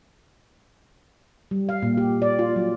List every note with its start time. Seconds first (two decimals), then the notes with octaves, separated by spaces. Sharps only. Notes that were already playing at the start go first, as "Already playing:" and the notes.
1.51 G3
1.69 F5
1.83 A#2
1.97 G4
2.22 D5
2.39 F4
2.56 F#3